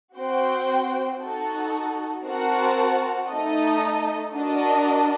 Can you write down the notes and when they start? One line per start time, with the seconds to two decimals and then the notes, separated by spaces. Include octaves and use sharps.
0.15 C4 F#4 C5 G5
1.19 D#4 F#4 A4
2.24 C4 F#4 A#4 F#5 A5
3.29 A3 D#4 A4 D#5
4.34 D4 F#4 A#4 D#5 A5